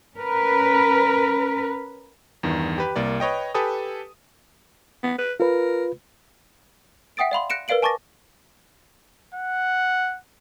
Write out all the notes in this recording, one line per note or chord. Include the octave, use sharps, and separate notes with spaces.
C#4 A#4 B4
E2 G2 D#3
G4 B4
C2 A#3 D5
B4 C#5 D#5 G5
G4 A4 B4 G#5 D#6
B3
B4
F4 A#4 B4
E5 F#5 G5 D#6 A6 D7
D5 F5 B5 C6
F#6 A#6 C#7 D7 E7
A#4 B4 D5 F5 D7 F#7
G#5 A5 C#6 D6 A6 A#6
F#5